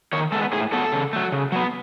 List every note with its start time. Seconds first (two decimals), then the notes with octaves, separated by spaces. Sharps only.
0.13 D#3 C#5
0.32 G#3 B3 A4
0.53 A2 G#4
0.72 F#3 B3 A4
0.92 C#3
1.13 F#3 A3
1.32 C#3
1.52 F#3 B3